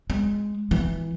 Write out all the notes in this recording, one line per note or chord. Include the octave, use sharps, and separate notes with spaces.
G#3
E3